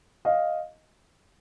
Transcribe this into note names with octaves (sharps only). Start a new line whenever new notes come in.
D#5 F5